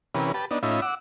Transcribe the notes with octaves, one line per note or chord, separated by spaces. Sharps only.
C3 E3 C#4 G4 A#4 B4
G4 B4 A5
B3 D4 D#4
A2 C#4 D#4 F4 E5 B5
F#5 D6 E6